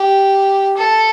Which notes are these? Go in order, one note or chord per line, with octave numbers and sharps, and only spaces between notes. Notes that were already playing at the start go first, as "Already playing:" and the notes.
Already playing: G4
A4